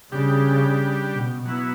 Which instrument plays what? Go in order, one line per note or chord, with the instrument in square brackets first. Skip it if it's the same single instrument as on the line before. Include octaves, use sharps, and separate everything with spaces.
[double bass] C#3 [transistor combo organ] G3 D4 G4
[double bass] B2
[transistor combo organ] F#3 B3 E4